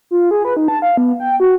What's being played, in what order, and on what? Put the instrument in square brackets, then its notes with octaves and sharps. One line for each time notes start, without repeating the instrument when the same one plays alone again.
[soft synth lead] F4
G#4
B4
D#4
A5
F5
B3
G5
F#4